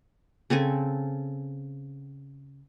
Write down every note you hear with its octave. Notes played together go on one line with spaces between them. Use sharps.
C#3 C4 A4 G#5